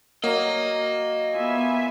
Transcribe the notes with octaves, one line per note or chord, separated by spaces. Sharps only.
F#3 A#3 D#5
B3 F4 E5 G#5